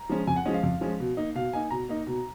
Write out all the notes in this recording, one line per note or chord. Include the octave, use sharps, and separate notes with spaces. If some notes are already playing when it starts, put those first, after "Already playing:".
Already playing: A#5
F3 G#3 C#4
F2 G#5
F#5
F3 G#3 C#4 D#5
F5
F2
F3 G#3 C#4
B2
A#3 D#4
B2 F5
A#3 D#4 G#5
B2 A#5
A#3 D#4
B2